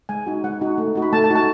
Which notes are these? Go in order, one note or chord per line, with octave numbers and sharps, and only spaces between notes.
G#3 G#5
D#4 F#4
G#3 F#5
D#4 F#4
A3
D#4 F#4
B5
A3 A5
A5
D#4 F#4
A5